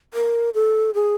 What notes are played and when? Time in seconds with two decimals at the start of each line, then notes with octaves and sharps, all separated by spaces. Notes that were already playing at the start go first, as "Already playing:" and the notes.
0.14 A#4
0.54 A4
0.95 G#4